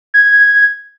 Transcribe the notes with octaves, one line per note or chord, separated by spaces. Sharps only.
G#6